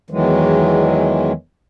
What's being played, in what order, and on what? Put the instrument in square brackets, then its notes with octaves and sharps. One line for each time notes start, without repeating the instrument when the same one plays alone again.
[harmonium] E2 D#3 E3 F#3 G#3